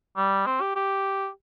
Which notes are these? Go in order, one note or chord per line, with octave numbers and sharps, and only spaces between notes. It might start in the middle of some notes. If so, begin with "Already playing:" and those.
G3
C4
G4
G4